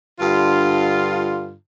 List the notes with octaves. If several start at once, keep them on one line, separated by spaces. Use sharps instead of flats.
G2 D3 F4